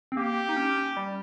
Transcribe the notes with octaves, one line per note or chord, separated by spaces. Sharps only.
C4
A#3 G4
D#4
C#4
C#4
G3